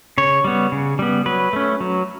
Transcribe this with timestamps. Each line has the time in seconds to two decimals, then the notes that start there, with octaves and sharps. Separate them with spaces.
0.18 C#3 C#5
0.44 G3 B3
0.72 C#3
0.99 G3 B3
1.26 F#3 B4
1.53 A3 C#4
1.80 F#3